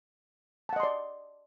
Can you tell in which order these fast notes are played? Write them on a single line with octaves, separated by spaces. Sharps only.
A5 F#5 D#5 C6 D5